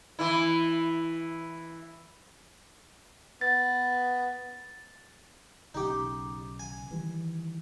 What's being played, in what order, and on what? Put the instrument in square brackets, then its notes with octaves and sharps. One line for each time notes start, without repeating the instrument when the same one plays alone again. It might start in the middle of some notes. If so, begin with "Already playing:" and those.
[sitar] E3 E4
[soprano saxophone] B3 [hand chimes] A6
[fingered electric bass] B1 C#3 [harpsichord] D#4 G4
[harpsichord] G#5
[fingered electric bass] D#3 E3 G3